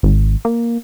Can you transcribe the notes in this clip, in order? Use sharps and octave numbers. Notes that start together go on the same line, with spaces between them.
G#1
A#3